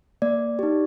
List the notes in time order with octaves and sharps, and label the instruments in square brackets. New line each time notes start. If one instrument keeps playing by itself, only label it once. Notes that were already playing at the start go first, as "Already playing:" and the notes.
[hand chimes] A#3 D5
D#4 G4